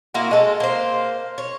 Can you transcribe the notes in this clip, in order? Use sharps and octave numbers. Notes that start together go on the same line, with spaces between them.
A#3 C4 E4 F#4
G#3 A4
A#3 C5
C#5